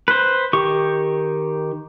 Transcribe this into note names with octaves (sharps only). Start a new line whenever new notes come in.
B4 C5
D#3 G4 C#6